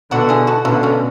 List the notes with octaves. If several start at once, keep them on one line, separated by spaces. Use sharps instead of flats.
B2 D3 D4 F#4
E4 G#4
F#4 A4
B2 D3 A3 C#4
A3 C#4